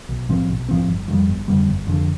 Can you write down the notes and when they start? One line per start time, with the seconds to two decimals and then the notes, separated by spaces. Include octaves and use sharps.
0.09 B1
0.29 A2 F3 C4
0.49 B1
0.69 A2 F3 C4
0.88 G1
1.08 F2 D3 G3
1.28 G1
1.48 F2 D3 G3
1.68 G1
1.87 F2 D3